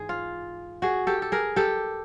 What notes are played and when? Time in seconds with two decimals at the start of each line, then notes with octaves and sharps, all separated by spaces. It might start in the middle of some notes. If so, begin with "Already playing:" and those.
Already playing: G#2 E3 G#3 G#4
0.09 F4
0.82 F#4 G#4
1.07 G4 A4
1.22 A4
1.32 G#4 A#4
1.56 G4 A4